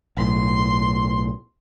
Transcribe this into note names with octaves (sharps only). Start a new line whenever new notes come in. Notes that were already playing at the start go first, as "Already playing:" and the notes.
B1 A2 C6